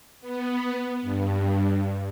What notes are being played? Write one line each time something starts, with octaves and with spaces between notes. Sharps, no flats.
B3
G2